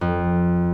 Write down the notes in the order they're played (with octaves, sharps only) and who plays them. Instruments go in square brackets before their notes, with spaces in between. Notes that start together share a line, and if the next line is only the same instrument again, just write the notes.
[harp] F2